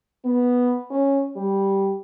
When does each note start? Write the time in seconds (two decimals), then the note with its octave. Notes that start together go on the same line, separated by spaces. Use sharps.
0.25 B3
0.91 C#4
1.37 G3